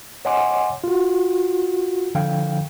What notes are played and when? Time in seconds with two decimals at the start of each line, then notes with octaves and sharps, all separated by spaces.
0.25 C#5 D#5 F#5 G#5 C6 D6
0.84 F4 F#4
2.15 D3 F3 F5 G5